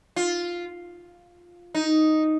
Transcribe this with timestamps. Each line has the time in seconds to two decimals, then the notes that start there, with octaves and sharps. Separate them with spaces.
0.16 F4
1.74 D#4